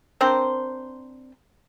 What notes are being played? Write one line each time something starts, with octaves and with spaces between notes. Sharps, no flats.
C4 D4 A#4 C5